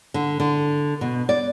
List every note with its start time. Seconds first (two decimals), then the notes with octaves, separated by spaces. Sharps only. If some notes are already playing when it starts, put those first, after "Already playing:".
0.14 D3
0.40 D3
1.01 B2
1.29 D5